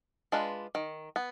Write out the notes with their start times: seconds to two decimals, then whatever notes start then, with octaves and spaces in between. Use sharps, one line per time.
0.32 G#3 D4 F4 B4
0.75 D#3
1.16 B3